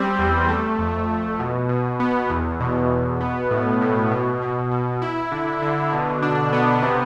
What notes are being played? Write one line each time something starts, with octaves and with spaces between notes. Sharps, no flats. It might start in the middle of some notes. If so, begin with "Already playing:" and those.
Already playing: G3 C4
E2
A3
F2
F2
B2
B2
B3
E2
B2
B2
B3
A2
A2
B2
B2
B2
E4
D3
D3
B2
D4
B3
C3